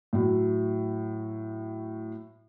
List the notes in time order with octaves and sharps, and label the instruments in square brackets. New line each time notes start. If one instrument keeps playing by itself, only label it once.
[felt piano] A2 F#3